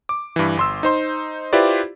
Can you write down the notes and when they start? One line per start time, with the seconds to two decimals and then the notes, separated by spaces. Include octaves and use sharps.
0.09 D6
0.36 G2 E3
0.57 G1 C6 E6
0.83 D#4 C5 C6
1.53 E4 F4 G4 B4 C5 D5